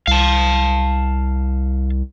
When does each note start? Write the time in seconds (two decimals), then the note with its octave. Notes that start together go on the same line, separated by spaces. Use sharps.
0.07 C2 F5 A5